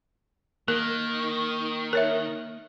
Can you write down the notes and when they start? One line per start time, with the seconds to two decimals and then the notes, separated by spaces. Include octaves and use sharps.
0.68 D#3 A#3 A#4
1.93 A#4 C#5 E5